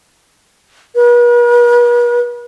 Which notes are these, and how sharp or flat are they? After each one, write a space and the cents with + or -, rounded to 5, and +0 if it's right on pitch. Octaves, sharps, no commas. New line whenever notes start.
B4 -45